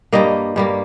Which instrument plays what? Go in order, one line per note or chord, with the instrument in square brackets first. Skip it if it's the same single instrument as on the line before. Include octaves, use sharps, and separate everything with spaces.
[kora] G2 G3 A#3 D#5
G2 G3 A#3